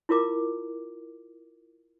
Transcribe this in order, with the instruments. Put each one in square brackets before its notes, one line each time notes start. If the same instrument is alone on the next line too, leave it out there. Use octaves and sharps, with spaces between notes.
[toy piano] E4 F4 A#4 D6